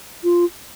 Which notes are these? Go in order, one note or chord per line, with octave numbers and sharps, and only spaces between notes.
F4